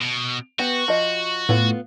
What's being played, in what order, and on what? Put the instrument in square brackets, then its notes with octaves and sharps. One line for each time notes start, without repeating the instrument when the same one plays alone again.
[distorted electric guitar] B2
[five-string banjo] B3 G4 [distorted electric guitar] F#4
[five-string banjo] F3 D#5
[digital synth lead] A2 [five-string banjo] B3 F4